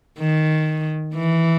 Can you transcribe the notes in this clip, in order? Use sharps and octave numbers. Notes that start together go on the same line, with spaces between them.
D#3
E3